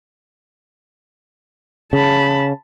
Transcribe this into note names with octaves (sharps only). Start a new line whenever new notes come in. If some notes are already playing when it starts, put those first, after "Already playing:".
C#3 A5 B5